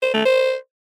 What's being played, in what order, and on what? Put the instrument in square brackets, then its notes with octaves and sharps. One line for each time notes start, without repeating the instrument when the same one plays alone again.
[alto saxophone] C5
A3
C5